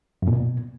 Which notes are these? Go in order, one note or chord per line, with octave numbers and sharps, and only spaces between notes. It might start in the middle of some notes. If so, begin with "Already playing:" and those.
F#2
A#2
B2